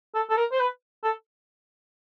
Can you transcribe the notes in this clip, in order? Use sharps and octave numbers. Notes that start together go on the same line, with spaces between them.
A4
A4
A#4
C5
B4
A4